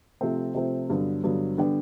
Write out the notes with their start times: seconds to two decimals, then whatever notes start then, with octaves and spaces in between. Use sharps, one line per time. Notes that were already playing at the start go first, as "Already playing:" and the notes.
0.21 C3 F3 A3 C4
0.55 C3 F3 A3 C4
0.89 G2 D3 F#3 B3
1.23 G2 D3 F#3 B3
1.58 D3 G3 B3 D4 G4